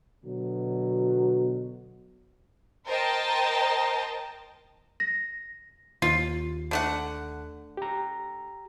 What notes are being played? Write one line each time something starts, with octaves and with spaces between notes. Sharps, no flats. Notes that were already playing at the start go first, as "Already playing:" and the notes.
B2 D3 F#3
A#4 C5 D#5 G5 A5
A#6
D#2 F4
D3 A3 F#5
G4 A#5